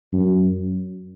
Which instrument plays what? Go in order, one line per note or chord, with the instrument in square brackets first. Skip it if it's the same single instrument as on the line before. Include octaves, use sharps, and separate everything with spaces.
[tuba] F#2